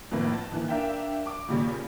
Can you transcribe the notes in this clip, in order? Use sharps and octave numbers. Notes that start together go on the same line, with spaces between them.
F2 A2 D#3 A#3 B3
A5
D#3 E3 A#3
D4 A#4 E5 F5 G5
D6
D#2 A#2 C#3 G3